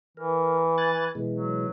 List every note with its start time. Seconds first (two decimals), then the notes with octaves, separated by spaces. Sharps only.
0.17 E3 A#4
0.78 G#5 F#6 A6
1.15 B2 E3 G#3
1.34 F#3